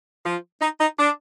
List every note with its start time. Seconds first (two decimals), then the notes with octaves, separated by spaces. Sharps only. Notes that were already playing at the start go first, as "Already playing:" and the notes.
0.25 F3
0.61 D#4
0.79 D#4
0.97 D4